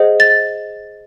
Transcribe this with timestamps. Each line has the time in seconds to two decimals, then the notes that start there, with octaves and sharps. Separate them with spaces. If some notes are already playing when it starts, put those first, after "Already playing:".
Already playing: G#4 C5 D#5 F#5
0.20 A6